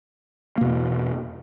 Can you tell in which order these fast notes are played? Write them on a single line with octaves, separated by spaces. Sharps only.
A#3 B2 E2